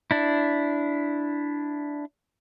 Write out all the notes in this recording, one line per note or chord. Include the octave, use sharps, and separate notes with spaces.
D4 E4